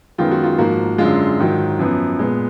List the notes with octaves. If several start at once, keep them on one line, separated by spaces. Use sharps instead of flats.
F#2 D#3 G#3 B3 F4
F#4
F4
G#2 F3 A#3 F#4
F#2 D3 G#3 F4
G#2 D#3 F#3
F#2 F3 B3
A#2 G#3 B3